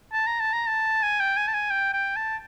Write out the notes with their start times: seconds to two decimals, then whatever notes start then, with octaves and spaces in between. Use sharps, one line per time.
0.12 A5
0.27 A#5
0.40 A5
0.53 A#5
0.67 A5
1.03 G#5
1.20 G5
1.37 G#5
1.48 A5
1.54 G#5
1.70 G5
1.93 G5
2.16 A5